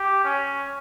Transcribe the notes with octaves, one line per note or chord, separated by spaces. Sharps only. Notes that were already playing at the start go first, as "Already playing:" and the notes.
Already playing: G4
C#4